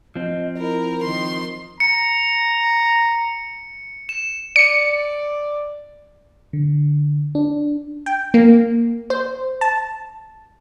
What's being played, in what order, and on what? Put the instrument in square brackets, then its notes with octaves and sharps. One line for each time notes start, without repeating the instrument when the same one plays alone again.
[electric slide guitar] F3 C4 [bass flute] D#5
[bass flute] E4 [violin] A#4
[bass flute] D#3 [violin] C6
[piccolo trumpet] A#5 [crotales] C#7
[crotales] E7
[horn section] D5 [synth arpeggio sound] C#7
[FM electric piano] D3
D4
[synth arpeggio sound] G5
A#3
C5
A5